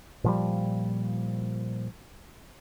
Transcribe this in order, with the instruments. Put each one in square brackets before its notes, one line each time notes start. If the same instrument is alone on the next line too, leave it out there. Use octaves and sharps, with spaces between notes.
[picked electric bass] A#2 F3 G3